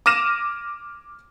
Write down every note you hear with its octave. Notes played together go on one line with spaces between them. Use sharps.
D6 F6 A#6 D#7 E7